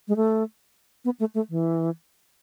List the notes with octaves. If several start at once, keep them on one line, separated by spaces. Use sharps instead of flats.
G#3
A3
B3
A3
A3
E3